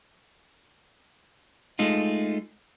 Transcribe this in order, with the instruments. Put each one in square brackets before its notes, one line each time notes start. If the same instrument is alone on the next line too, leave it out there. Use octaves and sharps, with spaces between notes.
[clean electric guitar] G#3 A3 D#4 F4